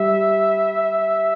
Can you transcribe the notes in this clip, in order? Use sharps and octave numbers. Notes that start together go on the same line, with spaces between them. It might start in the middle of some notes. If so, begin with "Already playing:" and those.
Already playing: G3 E5